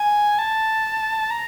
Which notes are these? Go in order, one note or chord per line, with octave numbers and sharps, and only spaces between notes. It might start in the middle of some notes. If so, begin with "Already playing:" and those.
Already playing: G#5
A5
A#5